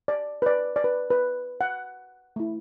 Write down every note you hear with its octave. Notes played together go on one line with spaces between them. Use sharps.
D5
B4
D5
D5
B4
B4
F#5
A3 E4